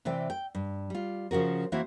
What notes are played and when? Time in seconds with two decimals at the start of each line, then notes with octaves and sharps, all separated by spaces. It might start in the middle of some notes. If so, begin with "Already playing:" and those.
0.05 C3 E3 D5 G5
0.30 G5
0.55 G2
0.90 G3 F4
1.31 C#3 F3 F#4 A#4
1.72 E3 A#3 C4 E4 F#4 C5